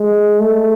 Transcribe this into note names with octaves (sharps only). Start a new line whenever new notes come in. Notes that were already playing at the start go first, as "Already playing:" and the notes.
Already playing: G#3
A3